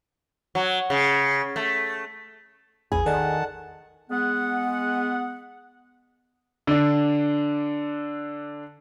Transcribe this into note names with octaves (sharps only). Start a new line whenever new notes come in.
F#3
C#3
A3
A1 E2 G#4 B5
D#3 A4 D5 D#5 F#5 A5
G#3 B3 F#5
D3 D4